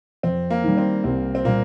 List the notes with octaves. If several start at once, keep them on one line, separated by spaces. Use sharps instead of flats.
F2 C4
A#3
D#3 G3
C4
C2 C4
C4
A#2 G3 A#3